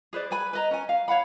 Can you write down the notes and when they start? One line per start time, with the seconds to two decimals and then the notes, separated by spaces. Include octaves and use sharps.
0.13 G#4 B4 C5 D5
0.31 G#4 B4 G#5 B5
0.53 B4 D#5 A#5
0.71 C#4 G#5
0.89 F5
1.08 C#5 F5 F#5 B5